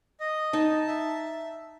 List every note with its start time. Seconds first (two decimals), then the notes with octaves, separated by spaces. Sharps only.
0.20 D#5
0.53 D#4 A5
0.87 E5